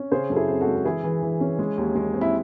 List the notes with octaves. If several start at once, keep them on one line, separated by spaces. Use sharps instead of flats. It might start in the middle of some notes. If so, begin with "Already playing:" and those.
Already playing: C#4
C#3 G#4 C5
F#2 A4
E4 G#4
C4
F#4 A4
G#3
A4
E3 E4 G#4
E3
E3
C#4
G#3
D#2
G#3
C4
E4